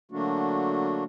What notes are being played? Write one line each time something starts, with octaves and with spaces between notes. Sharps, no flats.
D3 F#3 A3 A#3 D4 F#4